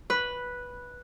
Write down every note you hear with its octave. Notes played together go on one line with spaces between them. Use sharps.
B4